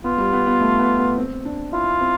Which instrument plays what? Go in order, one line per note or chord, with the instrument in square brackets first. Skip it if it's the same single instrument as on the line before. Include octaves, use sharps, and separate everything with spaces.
[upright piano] B3 [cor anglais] F4
[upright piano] G3
B3
B3
A3
B3
B3
C4
D4
[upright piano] E4 [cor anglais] F4
[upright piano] C4